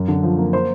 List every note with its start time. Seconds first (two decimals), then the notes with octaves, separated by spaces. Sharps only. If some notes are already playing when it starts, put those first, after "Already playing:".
Already playing: F#2
0.08 D3
0.23 F3
0.38 A#3
0.53 C5 C6